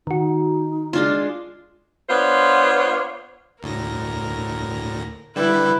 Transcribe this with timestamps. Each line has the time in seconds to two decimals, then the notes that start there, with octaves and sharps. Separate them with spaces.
0.07 D#3 D#4 F#4
0.93 G#3 D4 F4
2.09 B3 D4 F4 C5 C#5
3.63 D2 A2 A#4 A#6
5.36 D3 G3 E4 G4 B4